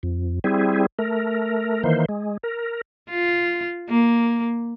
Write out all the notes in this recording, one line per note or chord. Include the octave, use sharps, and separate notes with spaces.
F2
G3 C4 E4 G#4
A3 A#4
D#3 E3 A#3 C5
G#3
A#4
F4
A#3